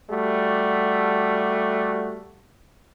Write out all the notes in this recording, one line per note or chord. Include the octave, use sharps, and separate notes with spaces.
G3 A3 F#4